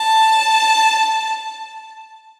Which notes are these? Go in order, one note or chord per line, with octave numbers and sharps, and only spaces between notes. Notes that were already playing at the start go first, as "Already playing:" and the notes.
Already playing: A5